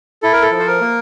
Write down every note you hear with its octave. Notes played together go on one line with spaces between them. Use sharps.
E4 A4
A#4
A4
F3
C5
A#4
A#3